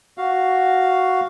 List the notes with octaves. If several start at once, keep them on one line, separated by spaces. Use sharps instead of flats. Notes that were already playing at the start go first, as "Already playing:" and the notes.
F#4 F5